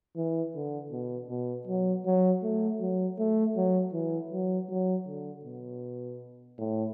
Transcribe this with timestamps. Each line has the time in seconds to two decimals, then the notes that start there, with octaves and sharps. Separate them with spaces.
0.16 E3
0.55 D3
0.92 B2
1.30 B2
1.67 F#3
2.06 F#3
2.43 A3
2.81 F#3
3.19 A3
3.56 F#3
3.93 E3
4.32 F#3
4.69 F#3
5.07 D3
5.45 B2
6.58 A2